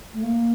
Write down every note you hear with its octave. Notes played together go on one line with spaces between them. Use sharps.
A3
A#3